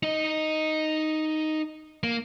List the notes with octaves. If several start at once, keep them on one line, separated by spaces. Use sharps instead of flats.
D#4 D#5
A#3